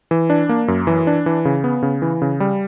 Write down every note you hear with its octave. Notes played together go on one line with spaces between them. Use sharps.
E3
D4
A#3
F#2
E3
D4
E3
C#3
B3
C#3
E3
C#3
G3